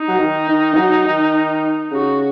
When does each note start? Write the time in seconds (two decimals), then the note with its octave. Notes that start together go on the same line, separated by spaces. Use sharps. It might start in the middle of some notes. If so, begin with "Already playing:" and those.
Already playing: D#4
0.08 F#3
0.19 D#3
0.48 D#3
0.73 D#3
0.77 F#3
1.06 D#3
1.92 C#3 F#4